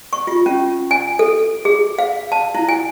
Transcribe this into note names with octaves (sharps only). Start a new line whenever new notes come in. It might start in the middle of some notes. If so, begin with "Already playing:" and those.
C#6
F4
C#4
G#5
A4
G#4
F5
A5
E4
G#5